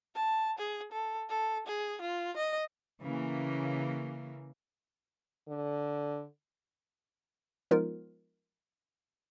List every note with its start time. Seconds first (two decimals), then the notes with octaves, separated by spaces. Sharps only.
0.15 A5
0.58 G#4
0.92 A4
1.29 A4
1.67 G#4
2.01 F4
2.37 D#5
3.01 C#3 E3 A#3
5.48 D3
7.71 F3 G#3 B3 D#4 F4 A#4